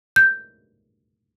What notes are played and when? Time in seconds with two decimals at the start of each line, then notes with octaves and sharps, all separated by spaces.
0.16 G6